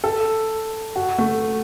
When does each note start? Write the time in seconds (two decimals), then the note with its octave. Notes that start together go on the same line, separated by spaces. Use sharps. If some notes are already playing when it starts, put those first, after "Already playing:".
0.04 A4
0.96 F#4
1.18 A3